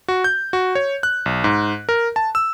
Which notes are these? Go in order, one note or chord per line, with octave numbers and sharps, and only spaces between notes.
F#4
G6
F#4
C#5
F#6
B1
G#2
A#4
A5
E6